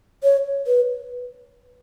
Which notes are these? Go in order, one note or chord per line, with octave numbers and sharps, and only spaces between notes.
C#5
B4